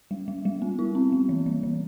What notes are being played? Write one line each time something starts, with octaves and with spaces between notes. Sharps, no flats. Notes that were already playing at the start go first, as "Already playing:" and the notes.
G3
G3
G3
B3
E4
C4
G3
E3
E3
E3